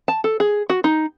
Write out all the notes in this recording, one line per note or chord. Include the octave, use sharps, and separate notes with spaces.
A5
A4
G#4
F#4
D#4